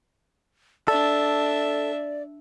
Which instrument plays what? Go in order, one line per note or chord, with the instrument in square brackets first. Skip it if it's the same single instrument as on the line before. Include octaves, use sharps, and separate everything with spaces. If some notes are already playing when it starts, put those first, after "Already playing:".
[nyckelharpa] D4 E5 [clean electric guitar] A4 [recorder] D5